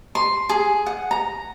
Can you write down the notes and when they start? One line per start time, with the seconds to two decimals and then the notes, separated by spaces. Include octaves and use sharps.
0.15 C6
0.49 G#4
0.86 F#5
1.11 A#5